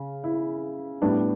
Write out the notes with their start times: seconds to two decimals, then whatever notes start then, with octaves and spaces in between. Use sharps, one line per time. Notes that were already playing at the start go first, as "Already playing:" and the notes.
Already playing: C#3
0.24 E4
1.02 A2 G3 B3 D4